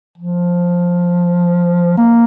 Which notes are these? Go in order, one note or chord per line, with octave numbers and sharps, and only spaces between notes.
F3
A#3